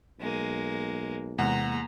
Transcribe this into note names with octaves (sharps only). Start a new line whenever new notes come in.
B1 G#3 A#3
E2 C3 G#3 A#3 F#5 A#5